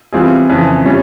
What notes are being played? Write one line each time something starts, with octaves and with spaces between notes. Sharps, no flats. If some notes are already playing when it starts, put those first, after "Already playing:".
E3 G3 C4 F4 G#4
F2 C#3 E3
G3 C#4